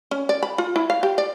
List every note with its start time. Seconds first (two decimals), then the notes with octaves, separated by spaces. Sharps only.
0.11 C#4
0.29 D5
0.43 B5
0.58 F4
0.76 E4
0.90 F5
1.03 G4
1.18 D5